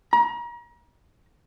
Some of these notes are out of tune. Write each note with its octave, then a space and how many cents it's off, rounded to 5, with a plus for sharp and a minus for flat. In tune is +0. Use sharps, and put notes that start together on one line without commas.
A#5 +35